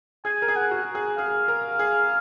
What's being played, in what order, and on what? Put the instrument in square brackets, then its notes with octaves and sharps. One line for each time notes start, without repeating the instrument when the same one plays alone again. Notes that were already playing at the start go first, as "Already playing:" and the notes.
[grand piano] G#4 [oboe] G#5
[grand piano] A#4
G#4
[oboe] F#5
[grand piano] F#4
G#4
[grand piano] G#4 [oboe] F5
[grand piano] A#4
G#4